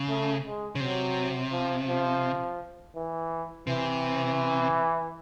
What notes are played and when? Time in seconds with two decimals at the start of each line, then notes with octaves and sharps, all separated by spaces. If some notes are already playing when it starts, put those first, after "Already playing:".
Already playing: C#3
0.09 A3
0.45 G#3
0.75 C#3
0.80 C3 F#3
1.51 F3
1.88 F3
2.96 E3
3.67 C3 E3